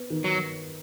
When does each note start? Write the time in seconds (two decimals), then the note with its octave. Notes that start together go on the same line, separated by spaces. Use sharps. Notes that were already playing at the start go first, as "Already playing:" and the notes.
Already playing: B3
0.10 D#3
0.24 F#3